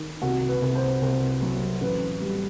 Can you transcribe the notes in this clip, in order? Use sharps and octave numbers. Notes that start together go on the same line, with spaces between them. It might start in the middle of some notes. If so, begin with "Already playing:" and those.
Already playing: D#3
C2 F#4
B4
C2
C5
C2 C5
F#3
A1 B4
G3